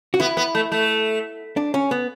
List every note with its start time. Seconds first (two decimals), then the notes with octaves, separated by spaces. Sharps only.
0.14 F#4
0.20 B3 E4
0.37 B3
0.55 A3
0.72 A3
1.57 D4
1.74 C#4
1.91 B3